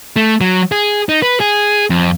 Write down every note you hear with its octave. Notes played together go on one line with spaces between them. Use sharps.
A3
F#3
G#4
D#4
B4
G#4
F2